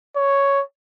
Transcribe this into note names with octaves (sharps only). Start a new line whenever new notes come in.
C#5